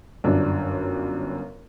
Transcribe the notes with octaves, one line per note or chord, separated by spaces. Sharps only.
G1 F#2 D4